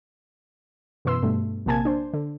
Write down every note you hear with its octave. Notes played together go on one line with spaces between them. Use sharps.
F#2 B2 E3 B4 C6 E6
G2 B2 A3
A#1 C3 A#3 G#5 A5 G#6
D4 C5
D3